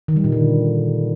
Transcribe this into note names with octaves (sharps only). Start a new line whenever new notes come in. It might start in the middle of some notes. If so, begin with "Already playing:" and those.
D#3
G3
A#2
D3